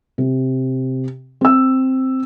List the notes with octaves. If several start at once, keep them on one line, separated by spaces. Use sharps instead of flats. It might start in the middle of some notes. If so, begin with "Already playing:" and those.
C3
C4 E6